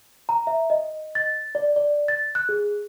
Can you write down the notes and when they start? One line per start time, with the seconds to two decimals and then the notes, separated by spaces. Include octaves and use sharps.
0.29 A#5
0.47 E5
0.70 D#5
1.15 A6
1.55 D5
1.76 D5
2.08 A6
2.35 F#6
2.49 G#4